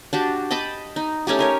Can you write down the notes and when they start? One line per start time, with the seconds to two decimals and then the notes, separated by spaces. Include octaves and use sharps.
0.13 D4 F#4 G4
0.51 D#5 G5 A5 B5
0.96 D#4
1.27 A3 C#4 D#4 G4
1.39 D#4 A#4 C#5